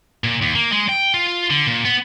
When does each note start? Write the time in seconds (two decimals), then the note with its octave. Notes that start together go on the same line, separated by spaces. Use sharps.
0.24 A#2
0.42 D#2
0.55 A#3
0.72 G#3
0.89 G5
1.14 F4
1.50 D3
1.67 A#2
1.85 B3